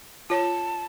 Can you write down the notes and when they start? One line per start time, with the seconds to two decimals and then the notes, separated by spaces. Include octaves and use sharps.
0.30 F4 C#5 A5